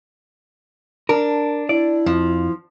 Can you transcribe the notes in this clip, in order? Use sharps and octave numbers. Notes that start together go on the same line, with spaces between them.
D4 A#4
E4 D5
F2 F3